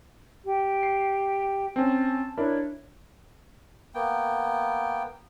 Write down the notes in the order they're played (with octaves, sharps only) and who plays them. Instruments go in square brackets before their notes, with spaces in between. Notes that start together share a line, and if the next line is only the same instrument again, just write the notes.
[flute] G4
[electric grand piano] C7
[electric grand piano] C4 C#4 [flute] A5
[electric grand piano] D4 E4 A#4 [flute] C#5
[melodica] A#3 B3 G5